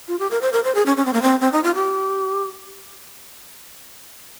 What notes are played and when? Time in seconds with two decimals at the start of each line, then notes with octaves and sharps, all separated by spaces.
0.08 F4
0.19 G4
0.31 A#4
0.42 C5
0.53 A#4
0.64 C5
0.75 G#4
0.86 C#4
0.97 C#4
1.06 C4
1.13 A#3
1.22 C4
1.41 C4
1.53 D#4
1.64 F4
1.75 G4